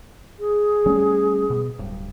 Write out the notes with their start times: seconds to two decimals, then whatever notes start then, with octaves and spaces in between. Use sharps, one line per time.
0.39 G#4
0.86 G3 A3 C#4
1.50 B2
1.79 D1 G2